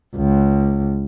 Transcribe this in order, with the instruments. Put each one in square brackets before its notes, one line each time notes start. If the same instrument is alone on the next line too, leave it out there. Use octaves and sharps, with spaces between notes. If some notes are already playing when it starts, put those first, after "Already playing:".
[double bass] C#2